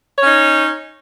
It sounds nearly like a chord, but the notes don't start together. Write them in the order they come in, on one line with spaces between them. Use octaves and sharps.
C#5 C#4 D#4